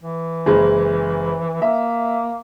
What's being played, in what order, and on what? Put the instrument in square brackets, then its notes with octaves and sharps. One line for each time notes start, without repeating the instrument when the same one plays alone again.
[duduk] E3
[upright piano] F#1 G#3
[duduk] A#3 [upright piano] E5